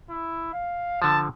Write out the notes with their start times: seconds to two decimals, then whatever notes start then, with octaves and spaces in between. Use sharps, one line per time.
0.10 E4
0.53 F5
1.02 D3 F3 A5